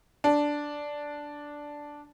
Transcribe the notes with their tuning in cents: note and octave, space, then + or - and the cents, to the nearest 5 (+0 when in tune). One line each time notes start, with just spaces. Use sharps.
D4 -5